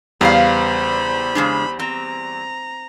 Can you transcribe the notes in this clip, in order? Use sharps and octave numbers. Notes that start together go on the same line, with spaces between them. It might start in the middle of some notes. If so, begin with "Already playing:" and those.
E2 C#3 G3 B3 C5 F5 B5
C#3 G#3 D4
C4 A#5